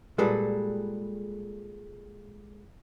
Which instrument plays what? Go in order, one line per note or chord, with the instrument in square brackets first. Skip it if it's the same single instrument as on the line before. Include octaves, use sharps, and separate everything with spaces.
[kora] A#2 G3 G#4 [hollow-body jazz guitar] G#3 A4 B4